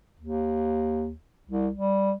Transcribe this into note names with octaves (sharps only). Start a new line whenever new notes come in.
D#2
C2
G3